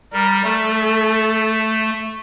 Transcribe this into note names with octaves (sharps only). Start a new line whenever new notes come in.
G3 A#4
A3 A4